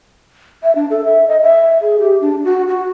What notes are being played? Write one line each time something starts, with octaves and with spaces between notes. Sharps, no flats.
E5
D4
A4
E5
D#5
E5
G#4
G4
D4
F#4
F#4